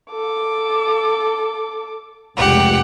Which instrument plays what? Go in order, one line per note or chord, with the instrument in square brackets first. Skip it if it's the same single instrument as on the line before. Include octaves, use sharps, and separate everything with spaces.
[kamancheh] A4 D6
[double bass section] F1 C#2 [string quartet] G4 F#5